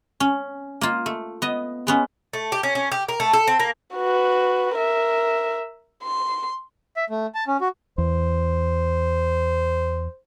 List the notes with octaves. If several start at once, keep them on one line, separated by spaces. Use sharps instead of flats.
C#4
A#3 F4
A3
B3 D#5
G#3 B3 C#4
A3
G4
C#4
C#4
G4
A#4
A3
A4
C4
A#3
F#4 B4
A#4 E5
C6
E5
A3
A5
C#4
F#4
E2 C5